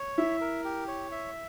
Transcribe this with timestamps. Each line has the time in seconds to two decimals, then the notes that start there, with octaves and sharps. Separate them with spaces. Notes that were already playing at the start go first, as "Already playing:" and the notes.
Already playing: C#5
0.18 E4 E5
0.41 A#4
0.64 G4
0.88 C#5
1.12 E5